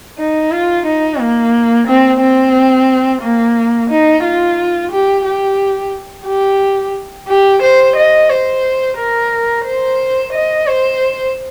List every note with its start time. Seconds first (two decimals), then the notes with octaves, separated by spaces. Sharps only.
0.18 D#4
0.52 F4
0.86 D#4
1.20 A#3
1.87 C4
2.21 C4
3.22 A#3
3.90 D#4
4.24 F4
4.92 G4
5.25 G4
6.27 G4
7.28 G4
7.62 C5
7.96 D#5
8.30 C5
8.98 A#4
9.65 C5
10.33 D#5
10.66 C5